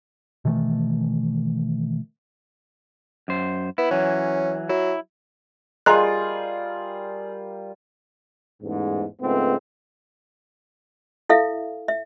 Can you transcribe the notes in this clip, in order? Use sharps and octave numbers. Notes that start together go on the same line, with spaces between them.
B2 D#3 E3 A3
F#2 C5
B3 E4
E3 F#3 C#4
F#3 E4
G3 F4 G#4 A#4 D#5 A#5 C6 F#6
A1 E2 G#2
C#2 G#2 A3 B3 C4
E4 A4 E5 F5
E5